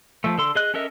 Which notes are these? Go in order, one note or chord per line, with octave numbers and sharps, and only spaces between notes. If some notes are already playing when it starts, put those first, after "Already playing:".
F3 A3
D3 A4 C6
G#4 D#5 F#6
C#4 A4 A#4 D#5 E5